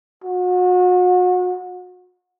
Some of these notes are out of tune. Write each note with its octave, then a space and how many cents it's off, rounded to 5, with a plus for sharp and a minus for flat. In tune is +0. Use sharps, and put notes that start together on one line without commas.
F#4 -35